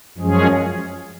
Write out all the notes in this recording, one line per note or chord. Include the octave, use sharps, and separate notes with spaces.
F#2 F3 G#3 C#4 G#4